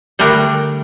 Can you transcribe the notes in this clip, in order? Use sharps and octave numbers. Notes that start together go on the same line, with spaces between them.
D3 G3 A3 D4 A#4